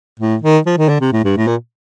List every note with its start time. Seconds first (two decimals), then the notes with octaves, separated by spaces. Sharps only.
0.20 A2
0.42 D#3
0.66 F3
0.78 D#3
0.89 D3
1.01 C3
1.13 A2
1.24 G2
1.37 A2
1.47 A#2